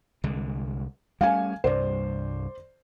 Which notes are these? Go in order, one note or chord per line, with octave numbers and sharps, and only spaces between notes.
C2 D3 G#3
G3 A3 C#4 F5 G#5
C2 G2 C5 D5